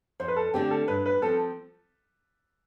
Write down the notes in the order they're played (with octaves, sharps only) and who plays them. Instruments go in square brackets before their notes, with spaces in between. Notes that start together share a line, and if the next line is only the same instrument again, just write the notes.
[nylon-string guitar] F2 [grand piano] C5
[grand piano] B4
A4
[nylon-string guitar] D3 A3 C4 [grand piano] G4
[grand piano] A4
[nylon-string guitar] G2 [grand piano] B4
[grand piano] B4
[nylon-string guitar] F3 C4 [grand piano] A4